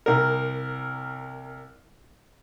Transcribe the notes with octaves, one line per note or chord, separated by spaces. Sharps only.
C2 A#4